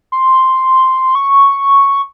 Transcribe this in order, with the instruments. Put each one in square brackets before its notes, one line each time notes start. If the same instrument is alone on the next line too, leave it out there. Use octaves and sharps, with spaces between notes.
[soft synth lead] C6
C#6